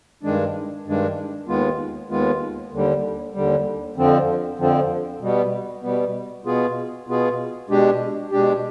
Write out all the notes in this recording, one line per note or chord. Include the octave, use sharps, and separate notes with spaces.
G2 D#3 G#3 D4
G2 D#3 G#3 D4
D#2 D#3 G#3 B3 F4
D#2 D#3 G#3 B3 F4
D#2 D3 G3
D#2 D3 G3
F2 D3 F3 C4
F2 D3 F3 C4
B2 G3 B3
B2 G3 B3
B2 B3 F4 G#4
B2 B3 F4 G#4
B2 G#3 D4 G4
B2 G#3 D4 G4